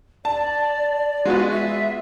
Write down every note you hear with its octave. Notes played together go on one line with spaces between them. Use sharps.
D5 A5
G#3 B3 F4 F#4
E5